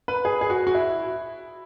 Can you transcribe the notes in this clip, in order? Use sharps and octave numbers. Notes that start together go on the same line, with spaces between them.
B4
G#4
G#4
F#4
F#4
E4